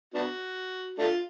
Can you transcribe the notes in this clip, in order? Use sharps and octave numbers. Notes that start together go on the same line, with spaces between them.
B3 D4 F#4
A3 D4 F4